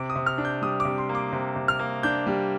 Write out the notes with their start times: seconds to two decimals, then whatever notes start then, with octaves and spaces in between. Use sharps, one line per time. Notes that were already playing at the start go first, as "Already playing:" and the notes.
Already playing: C3 D6
0.10 D#6
0.16 C3
0.26 F6
0.38 D4
0.45 G6
0.62 G3 D#6
0.80 D6
0.85 C3
0.98 C6
1.09 A#3
1.15 D6
1.33 C3
1.56 C3
1.68 F6
1.79 A#3
2.03 D4 G6
2.27 G3